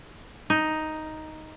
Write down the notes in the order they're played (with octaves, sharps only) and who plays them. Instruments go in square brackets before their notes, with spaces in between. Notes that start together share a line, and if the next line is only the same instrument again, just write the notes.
[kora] D#4